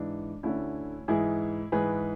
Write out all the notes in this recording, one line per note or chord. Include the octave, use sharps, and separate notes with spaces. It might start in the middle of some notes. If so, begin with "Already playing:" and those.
Already playing: G#2 E3 D4
D2 D3 C#4 E4
G#2 E3 E4 G#4
G#2 E3 G#4 B4